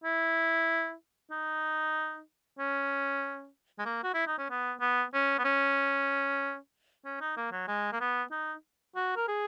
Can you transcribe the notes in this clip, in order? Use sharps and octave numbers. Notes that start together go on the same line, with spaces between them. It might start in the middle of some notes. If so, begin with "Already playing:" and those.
E4
D#4
C#4
G#3
A#3
F#4
E4
D#4
C#4
B3
B3
C#4
B3
C#4
C#4
D#4
A#3
F#3
G#3
A#3
B3
D#4
F#4
A#4
G#4